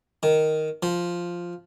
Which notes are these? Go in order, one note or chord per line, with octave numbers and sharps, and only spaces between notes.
D#3
F3